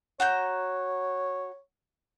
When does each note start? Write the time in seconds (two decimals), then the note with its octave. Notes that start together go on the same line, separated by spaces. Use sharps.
0.20 F#4 C#5 A#5 G6